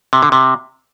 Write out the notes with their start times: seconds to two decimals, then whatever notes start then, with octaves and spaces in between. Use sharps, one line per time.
0.13 C3
0.22 D3
0.32 C3